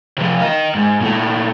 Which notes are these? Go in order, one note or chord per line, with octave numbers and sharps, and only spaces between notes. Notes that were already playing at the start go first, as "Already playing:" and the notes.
C3 F3
A#4 D#5
G#2
A#2 A3